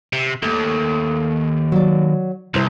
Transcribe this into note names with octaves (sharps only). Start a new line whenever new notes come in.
C3
D#2 A3
F#3 D5
C2 C3 E4 C5